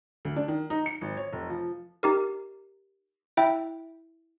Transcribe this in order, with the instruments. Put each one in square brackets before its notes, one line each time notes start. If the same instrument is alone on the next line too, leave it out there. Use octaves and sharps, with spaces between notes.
[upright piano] D2
D4
D#3
D#4
C#7
G#1
C#5
F1
F3
[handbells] D#4 G4 A#4
E4 E5 G5